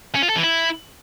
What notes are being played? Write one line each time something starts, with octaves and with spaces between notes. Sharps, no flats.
C#4
F4
A4
E3
E4